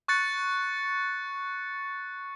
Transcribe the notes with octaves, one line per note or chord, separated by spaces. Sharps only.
C#6 F#6 A6 C#7